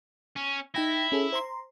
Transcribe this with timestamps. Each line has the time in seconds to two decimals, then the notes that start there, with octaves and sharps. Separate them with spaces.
0.36 C#4
0.74 D#4 E4 G5 A#6
1.12 C#4 G#4 A4
1.32 C5 A#5 C6